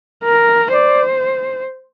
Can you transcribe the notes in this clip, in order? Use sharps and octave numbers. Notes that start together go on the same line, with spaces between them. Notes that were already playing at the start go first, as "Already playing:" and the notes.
A#4
C5 D5